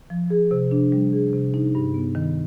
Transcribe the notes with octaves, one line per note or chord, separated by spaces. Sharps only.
F3
G#4
C3
D4
G3
G#4
C3
D#4
G2
B3
D#3